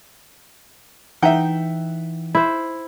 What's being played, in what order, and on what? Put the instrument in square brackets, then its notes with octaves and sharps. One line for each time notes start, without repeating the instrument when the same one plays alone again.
[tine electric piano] E3 [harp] D#4 G5 [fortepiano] E5 F#5
[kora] E4 C5